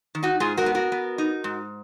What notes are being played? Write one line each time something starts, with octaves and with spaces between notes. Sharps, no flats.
D#3
D#4 F#4
G#2 F4 G#4
F#4 A#4
B3
F#4 A#4
B3
D#4
G#2